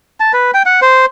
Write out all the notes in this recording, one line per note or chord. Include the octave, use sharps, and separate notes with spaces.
A5
B4
G5
F#5
C5